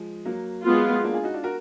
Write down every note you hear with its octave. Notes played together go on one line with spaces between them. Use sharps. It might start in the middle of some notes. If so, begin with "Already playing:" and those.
Already playing: F3 G#3
F#3 A#3
G#3 B3 F4
B3
A#3 D4
F4 G#4
D#4 F#4
D4 F4
F#4 A#4